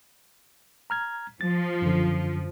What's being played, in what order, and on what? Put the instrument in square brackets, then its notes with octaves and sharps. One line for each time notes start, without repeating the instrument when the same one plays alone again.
[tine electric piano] A#5 F6 G#6
[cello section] F3 [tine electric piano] A6
[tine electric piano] F#2 D3